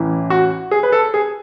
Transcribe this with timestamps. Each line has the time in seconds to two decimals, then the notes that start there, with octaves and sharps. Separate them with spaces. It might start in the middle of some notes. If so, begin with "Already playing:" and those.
Already playing: A1 A2 E3
0.30 F#4
0.71 G#4
0.83 B4
0.92 A4
1.14 G#4